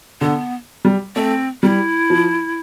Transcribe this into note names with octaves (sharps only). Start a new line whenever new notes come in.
D3 B3
G3
A3 C4
G3 E4
F3